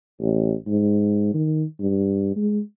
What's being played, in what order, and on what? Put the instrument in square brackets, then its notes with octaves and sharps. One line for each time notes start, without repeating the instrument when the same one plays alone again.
[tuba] A1
G#2
D#3
G2
G#3